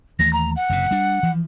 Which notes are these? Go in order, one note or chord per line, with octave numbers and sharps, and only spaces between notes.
D#2 E3 A3 A#6
A#5
F#5
F#1 F#2 C3
G3 D4
E3 F3